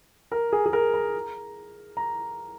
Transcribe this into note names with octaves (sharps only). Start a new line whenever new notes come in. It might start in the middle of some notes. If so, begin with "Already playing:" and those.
A#4
G#4
G#4
A#4
A#5
A#5